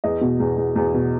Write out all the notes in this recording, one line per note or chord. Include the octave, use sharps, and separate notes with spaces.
E2 D#5
B2
E2
E2
E2
B2